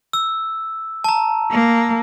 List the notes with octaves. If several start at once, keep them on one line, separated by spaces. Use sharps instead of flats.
E6
A5 A#5
A#3